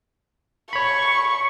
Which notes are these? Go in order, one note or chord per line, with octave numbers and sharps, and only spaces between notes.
C#5 B5 C#6